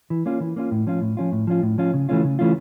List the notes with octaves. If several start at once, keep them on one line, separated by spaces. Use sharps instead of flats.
E3
A#3 C#4 F4
E3
A#3 C#4 F4
A2
F3 C#4 F4
A2
F3 C#4 F4
A2
F3 C#4 F4
A2
F3 C#4 F4
C#3
E3 A3 C#4 F4
C#3
E3 A3 C#4 F4